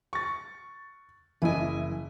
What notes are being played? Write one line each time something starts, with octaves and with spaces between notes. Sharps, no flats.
C#6 A6
F#1 E3 E4 D#5 G#5